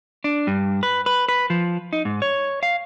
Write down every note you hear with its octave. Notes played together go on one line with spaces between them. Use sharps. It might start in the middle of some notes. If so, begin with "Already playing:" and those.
D4
G2
B4
B4
B4
F3
D#4
G#2
C#5
F5